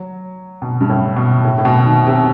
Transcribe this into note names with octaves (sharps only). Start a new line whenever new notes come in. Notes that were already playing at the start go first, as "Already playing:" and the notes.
Already playing: F#3
B2
G2
A2
B2
A2
A2
B2
D#3
C3